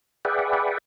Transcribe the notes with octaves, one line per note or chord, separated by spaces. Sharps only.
G#4 B4 D5 E5 F#5 G5